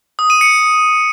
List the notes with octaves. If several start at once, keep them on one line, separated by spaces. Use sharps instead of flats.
D#6
D#7
C#7